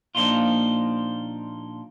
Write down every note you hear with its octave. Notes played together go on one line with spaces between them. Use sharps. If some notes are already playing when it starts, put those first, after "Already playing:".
A#2 F3 A#3 D4 D#4 F4